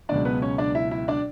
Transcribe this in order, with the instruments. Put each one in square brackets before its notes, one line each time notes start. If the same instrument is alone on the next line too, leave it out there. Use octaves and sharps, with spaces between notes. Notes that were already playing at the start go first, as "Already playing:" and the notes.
[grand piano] C#2 B2 F#3 D4 D5
B3 B4
C#4 C#5
D4 D5
E4 E5
E4 E5
D4 D5